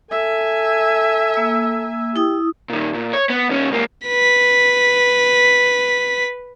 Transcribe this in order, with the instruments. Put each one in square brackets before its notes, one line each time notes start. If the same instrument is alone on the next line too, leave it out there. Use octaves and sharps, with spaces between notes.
[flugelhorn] A4 [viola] E5 G#5
[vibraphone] A#3 E6
[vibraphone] E4 D#6 [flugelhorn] G4
[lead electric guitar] A#2 D#3
A#2
C#5
B3
D#2 C#4
C#2 A#3
[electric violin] B4 B6